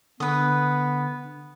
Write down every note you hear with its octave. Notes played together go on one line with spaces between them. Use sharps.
D3 B3 B4 D#6